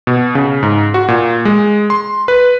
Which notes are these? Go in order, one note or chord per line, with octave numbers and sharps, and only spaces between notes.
B2
C#3
G#2
F#4
A#2
G#3
C6
B4